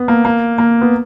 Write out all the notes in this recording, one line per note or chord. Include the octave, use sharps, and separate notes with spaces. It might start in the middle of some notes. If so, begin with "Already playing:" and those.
Already playing: B3
A#3
A#3
A#3
B3